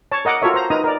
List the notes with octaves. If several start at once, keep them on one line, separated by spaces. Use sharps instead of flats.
C#5 A5
A#4 D#5 F#5 D6
F4 F#4 A4 A#4 C#5 E5
C5 A#5
D#4 A#4 B4 A#5 D#6
A#4 D5